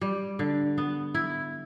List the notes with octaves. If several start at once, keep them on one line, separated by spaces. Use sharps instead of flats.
G3
D3
B3
E4